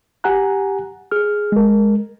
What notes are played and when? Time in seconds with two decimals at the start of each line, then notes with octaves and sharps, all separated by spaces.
0.24 G4 F#5 G#5 A#5 F#6
1.11 G#4 F6
1.52 G#3 A#4